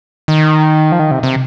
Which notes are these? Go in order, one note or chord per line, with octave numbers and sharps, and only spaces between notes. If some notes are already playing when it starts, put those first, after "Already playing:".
D#3
F3
D#3
C3
C3